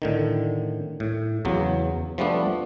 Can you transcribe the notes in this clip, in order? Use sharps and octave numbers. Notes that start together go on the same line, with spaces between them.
A2 D3 D#3
A2
E2 C#3 F#3
F3 G3 A3 B3 D4